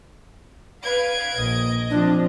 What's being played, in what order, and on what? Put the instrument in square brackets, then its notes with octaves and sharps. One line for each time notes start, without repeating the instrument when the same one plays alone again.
[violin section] B4 F5 [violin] G#6 D7
[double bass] A#1 [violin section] D#5
[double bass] F3 C4 [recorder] D4